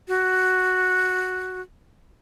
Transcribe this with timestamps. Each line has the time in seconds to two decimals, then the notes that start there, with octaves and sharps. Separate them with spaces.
0.08 F#4